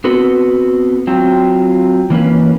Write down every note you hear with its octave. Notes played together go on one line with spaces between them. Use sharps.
B3 C4 F#4 A4 B4
F#3 C4 F4
E3 A#3 C#4 B4